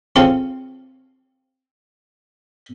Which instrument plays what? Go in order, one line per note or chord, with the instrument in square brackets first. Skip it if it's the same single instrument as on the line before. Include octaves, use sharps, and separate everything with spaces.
[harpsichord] C#3 C4 F4 A4